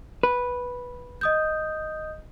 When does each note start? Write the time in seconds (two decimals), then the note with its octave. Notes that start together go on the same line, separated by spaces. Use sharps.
0.23 B4
1.21 D#5 D#6 G6